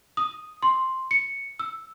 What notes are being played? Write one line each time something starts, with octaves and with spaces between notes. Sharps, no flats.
D#6
C6
C#7
E6